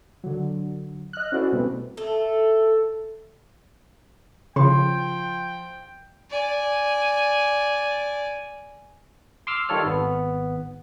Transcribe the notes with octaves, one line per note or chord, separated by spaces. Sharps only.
D3 F#3
D#5 F6 F#6
C#4 E4 F#4 A4 C5 D5
B2 G3 A3 B3 C4
A3 A4
C#3 F3 G5 C6
D5 G#5
C6 D6 E6 F6
D#3 G3 F4 A4 C#5 F6
G#1 B3